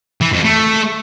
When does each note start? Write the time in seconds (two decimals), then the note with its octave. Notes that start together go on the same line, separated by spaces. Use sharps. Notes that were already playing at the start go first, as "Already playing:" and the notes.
0.21 E3
0.33 F2
0.44 A3